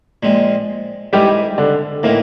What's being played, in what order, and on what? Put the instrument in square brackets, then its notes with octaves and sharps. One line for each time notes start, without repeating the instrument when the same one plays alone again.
[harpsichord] A#2 F3 G#3 C4
[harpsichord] G#2 E3 G#3 C4 [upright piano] G3 G4
[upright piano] D3 D4
[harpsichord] A2 E3 A3 C4 D#4 [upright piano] A#3